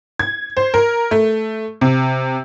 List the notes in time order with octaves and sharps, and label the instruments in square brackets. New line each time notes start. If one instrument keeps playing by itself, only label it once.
[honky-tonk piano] G#6
C5
A#4
A3
C3